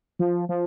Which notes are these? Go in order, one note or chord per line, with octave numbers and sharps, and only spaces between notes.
F3
F3